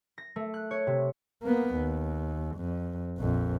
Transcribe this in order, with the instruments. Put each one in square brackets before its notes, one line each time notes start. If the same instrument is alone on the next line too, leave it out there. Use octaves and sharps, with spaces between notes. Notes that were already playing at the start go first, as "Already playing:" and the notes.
[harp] A#6
A3
F#6
C#5
C3
[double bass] A#3 B3
D#2
F2
A#1 F2